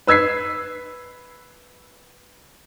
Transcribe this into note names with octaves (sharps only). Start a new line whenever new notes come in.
B4 E6 G#6 B6 C7